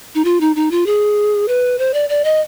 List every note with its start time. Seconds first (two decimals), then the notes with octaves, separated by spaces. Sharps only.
0.15 D#4
0.25 F4
0.41 D#4
0.56 D#4
0.71 F4
0.86 G#4
1.48 B4
1.79 C5
1.94 D5
2.09 D5
2.24 D#5